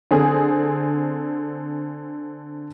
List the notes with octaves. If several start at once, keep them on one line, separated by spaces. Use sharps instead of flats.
D3 C4 G#4